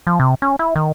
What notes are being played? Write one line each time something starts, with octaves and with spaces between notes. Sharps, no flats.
F3
C3
C#4
E4
D#3